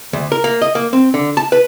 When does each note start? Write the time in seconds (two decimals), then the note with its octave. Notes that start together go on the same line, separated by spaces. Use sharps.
0.13 D2
0.32 A#4
0.44 A#3
0.62 D#5
0.75 A#3
0.93 C4
1.14 D3
1.37 A5
1.52 B4